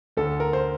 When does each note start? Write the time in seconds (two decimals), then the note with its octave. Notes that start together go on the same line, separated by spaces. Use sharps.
0.17 D2 A4
0.40 A#4
0.53 C5